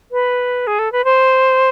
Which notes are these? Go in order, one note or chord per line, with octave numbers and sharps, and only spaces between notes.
B4
G#4
A4
B4
C5